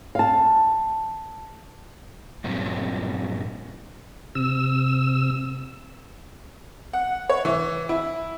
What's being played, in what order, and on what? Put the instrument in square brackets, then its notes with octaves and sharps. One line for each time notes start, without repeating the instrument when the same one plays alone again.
[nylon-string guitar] F5 A5
[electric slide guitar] G2 A#2 F#3 C4 C#4
[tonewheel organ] C3 E6
[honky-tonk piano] F#5
C#5
E3
E4